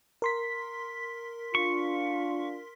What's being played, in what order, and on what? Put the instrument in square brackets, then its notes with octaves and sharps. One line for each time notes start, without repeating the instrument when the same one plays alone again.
[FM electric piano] A#4 C6 B6
[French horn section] D4 F4 [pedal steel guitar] C#6